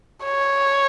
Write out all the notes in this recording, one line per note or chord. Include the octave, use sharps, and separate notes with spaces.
C#5